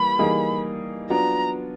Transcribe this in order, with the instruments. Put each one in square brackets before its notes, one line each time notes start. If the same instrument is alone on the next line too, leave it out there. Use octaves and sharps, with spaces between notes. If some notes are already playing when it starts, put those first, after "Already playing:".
Already playing: [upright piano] E3 G3 A#3 [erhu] B5
[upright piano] E3 G3 A#3 D#4 G#4
[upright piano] F#3 B3 D4 F4 [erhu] A#5